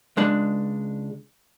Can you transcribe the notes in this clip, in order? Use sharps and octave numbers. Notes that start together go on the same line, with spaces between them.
C#2 G#3 D4